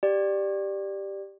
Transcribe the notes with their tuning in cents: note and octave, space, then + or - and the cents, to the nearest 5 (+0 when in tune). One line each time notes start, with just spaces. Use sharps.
G4 +0 D5 +10